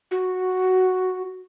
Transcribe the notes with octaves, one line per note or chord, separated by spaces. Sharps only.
F#4